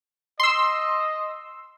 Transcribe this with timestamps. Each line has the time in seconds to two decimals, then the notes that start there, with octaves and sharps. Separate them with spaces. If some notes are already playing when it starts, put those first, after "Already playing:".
0.40 D#5 C6 E6